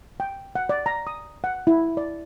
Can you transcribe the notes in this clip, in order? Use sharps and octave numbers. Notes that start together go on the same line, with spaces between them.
G5
F#5
D5
A#5
D#6
F#5
E4
D5